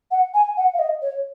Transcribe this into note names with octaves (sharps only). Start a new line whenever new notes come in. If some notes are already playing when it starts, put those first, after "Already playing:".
F#5
G#5
F#5
F5
D#5
C#5